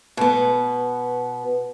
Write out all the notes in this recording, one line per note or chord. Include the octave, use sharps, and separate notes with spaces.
B2 B3